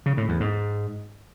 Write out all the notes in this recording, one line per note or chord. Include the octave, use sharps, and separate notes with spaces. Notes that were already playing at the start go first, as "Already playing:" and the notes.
C#3
A2
E2
G#2